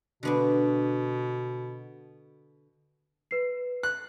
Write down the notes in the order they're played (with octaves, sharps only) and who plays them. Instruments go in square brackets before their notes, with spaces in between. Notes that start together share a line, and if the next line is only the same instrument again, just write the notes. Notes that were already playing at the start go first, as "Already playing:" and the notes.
[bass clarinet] B2 [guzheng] D3 B3 D4
[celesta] B4 C7
[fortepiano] F#6